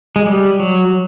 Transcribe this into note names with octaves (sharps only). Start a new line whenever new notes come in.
G#3
G3
F#3